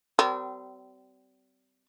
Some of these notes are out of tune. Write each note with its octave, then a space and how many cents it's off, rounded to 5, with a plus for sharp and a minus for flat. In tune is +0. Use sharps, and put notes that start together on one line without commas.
G3 -40 C4 -30 A#4 -15